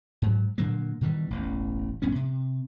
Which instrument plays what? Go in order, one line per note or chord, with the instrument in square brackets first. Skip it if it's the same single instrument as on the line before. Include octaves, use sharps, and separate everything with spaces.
[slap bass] G#2 F#3
A#2 D3 F#3 A#3
B2 D#3 E3 G3
E1 A1
A#1 G2 B3 C#4
C3